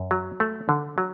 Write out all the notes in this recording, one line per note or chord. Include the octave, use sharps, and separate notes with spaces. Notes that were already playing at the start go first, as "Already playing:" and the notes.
Already playing: F#2
F#3
A3
D3
F#3